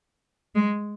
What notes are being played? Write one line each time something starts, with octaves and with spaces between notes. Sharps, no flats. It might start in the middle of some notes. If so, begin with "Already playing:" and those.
G#3